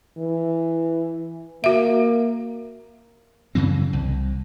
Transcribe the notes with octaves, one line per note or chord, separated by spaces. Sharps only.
E3
A#3 F#4 E5
F#2 C#3 E3 C4
C2